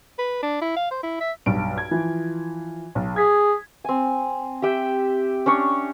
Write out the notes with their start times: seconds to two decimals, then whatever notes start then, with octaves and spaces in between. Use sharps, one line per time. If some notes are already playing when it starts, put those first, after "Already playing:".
0.18 B4
0.43 D4
0.62 E4
0.77 F5
0.91 C5
1.03 E4
1.21 E5
1.46 B1 G2 D7
1.78 G#6
1.91 E3 F3 F4
2.95 B1
3.16 G#4 G#6 B6
3.84 C4 G#5
4.62 G4 E5 G5
5.46 C#4 D4 C#5